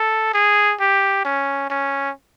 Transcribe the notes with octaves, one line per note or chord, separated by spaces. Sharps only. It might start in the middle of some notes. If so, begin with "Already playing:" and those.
Already playing: A4
G#4
G4
C#4
C#4